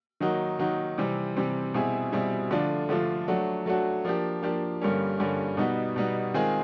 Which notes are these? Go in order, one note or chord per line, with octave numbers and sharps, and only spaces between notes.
D#3 F#3 A#3 D#4 F#4
D#3 F#3 A#3 D#4 F#4
C3 E3 G3 C4
C3 E3 G3 C4
B2 G3 C4 E4 G#4
B2 G3 C4 E4 G#4
D3 F3 A3 D4 F4
D3 F3 A3 D4 F4
F#3 A3 D4 F#4
F#3 A3 D4 F#4
F3 A#3 D4 G4
F3 A#3 D4 G4
G2 D3 G3 A#3 C#4
G2 D3 G3 A#3 C#4
B2 G3 B3 D#4 F#4
B2 G3 B3 D#4 F#4
D#3 G#3 C4 F4 G#4